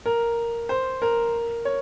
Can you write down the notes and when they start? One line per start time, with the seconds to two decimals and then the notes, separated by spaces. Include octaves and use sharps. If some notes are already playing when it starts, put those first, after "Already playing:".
0.06 A#4
0.69 C5
1.02 A#4
1.65 C#5